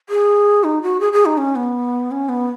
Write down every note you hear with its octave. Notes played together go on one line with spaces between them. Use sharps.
G#4
D#4
F#4
G#4
G#4
D#4
C#4
B3
C#4
B3